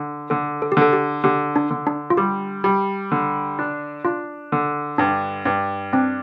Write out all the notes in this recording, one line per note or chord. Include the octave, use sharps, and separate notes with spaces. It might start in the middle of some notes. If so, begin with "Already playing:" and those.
Already playing: D3
D3 A4
A4
G4
D3 A4
G4
D3 G4
D4
D3
D4
F4
G3 G4
G3
D3
D4
D4 F4
D3
G2 D4
G2
C4 D4